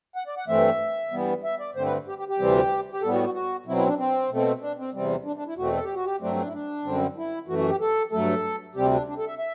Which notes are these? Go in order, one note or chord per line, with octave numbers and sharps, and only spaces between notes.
F#5
D5
F#5
G2 E3 A3 C4 E5
G2 E3 G3 B3
E5
D5
G2 D3 A3 C4 C5
B4
G4
G4
G4
D2 C3 E3 G3 C4
G4
A2 G3 B3 A4
F#4
F#4
F#4
B2 F#3 C4 E4
E4
D4
C4
B2 A3 C4
D4
C4
E2 C3 G3 C4
D4
D4
E4
E2 B2 A3 C4 F#4
A4
G4
F#4
G4
G2 F#3 A3 C4 D4
D4
E4
D4
F#2 D3 G3 C4
E4
F#2 E3 A3 F#4
F#4
G4
A4
G2 F#3 A3 A4
D2 C3 G3 C4 G4
D4
D4
A4
E5
E5